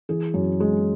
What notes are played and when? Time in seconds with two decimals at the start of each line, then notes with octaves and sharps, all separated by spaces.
0.09 E3 G#4
0.34 F#2
0.60 G#3